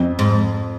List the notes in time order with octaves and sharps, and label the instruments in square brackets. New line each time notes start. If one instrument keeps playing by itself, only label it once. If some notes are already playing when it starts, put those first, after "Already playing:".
Already playing: [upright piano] F2
[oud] G#2